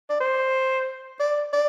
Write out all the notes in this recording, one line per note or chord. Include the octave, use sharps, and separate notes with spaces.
D5
C5
D5
D5